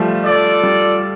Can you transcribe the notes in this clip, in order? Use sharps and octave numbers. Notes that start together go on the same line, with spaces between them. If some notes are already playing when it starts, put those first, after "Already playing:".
Already playing: F3 G3 A3
F4 A4 D5
G3